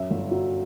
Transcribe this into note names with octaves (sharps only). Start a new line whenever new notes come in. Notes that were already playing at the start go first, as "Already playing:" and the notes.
Already playing: F#2 E5
G1
F#3